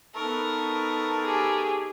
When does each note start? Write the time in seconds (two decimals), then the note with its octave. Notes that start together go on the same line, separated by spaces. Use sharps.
0.15 B3 D#4 A4 A#4 C#6
1.22 G4 G#4